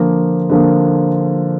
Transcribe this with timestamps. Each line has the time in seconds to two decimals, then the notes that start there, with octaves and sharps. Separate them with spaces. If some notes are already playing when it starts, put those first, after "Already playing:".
Already playing: D3 F3 A#3
0.50 D3 F3 A#3